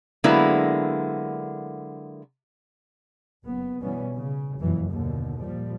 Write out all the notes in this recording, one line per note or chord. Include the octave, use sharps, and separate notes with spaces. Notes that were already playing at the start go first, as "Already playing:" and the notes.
D3 F#3 G#3 A#3 B3 E4
F#1 B3
B2 E3 G3 B3 C#4
C#3
F#1 F2 B2 E3 F#3
D#2 B2 D3
A#2 F3 G3